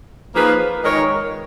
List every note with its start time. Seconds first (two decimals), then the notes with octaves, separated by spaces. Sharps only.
0.34 F3 A#3 D#4 G#4 B4
0.84 D#3 G#3 D#4 A#4 C#5